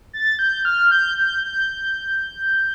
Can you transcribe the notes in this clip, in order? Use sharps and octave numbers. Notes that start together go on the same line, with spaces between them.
A6
G6
F6
G6
G6
G6